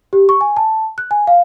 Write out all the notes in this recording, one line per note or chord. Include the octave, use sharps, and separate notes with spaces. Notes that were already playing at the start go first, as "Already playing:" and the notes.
G4
C#6
G#5
A5
F#6
G#5
F5